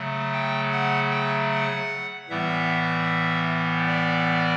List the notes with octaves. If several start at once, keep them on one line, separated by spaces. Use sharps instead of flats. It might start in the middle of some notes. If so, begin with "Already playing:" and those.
Already playing: C#3 F#3 A3
G5
F#5
G5
F#5
A2 E3 G3 B3 E5
D5